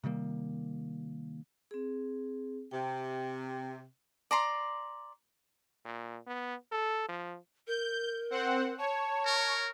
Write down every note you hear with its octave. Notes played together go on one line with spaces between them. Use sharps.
C3 D#3 G3 A#3
C4 G#4
C3 G5
D5 A#5 C6
A#2
B3
A4
F3
A#4 G6
C4 C5 F#5
C#5 A5
A#4